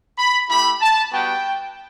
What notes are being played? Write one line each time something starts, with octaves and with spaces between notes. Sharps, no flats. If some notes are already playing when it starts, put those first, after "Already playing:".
B5
A3 E4 G4 B5
A5
G3 B3 F#4 G5